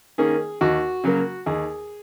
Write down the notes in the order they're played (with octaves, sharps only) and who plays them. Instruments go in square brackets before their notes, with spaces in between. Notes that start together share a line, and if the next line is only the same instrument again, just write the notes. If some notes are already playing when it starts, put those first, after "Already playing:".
[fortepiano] D#3 A#3 C#4 G#4
D#2 F#4
C#3 F#3 A#3
D#2 G#4